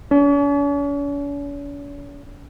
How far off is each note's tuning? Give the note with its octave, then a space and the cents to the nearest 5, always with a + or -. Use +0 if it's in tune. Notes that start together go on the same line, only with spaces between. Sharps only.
C#4 +45